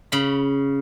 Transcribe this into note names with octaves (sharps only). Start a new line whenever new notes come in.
C#3 B5